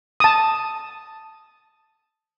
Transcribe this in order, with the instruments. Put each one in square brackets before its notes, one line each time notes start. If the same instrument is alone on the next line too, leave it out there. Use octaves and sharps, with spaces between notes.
[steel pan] A5 D#6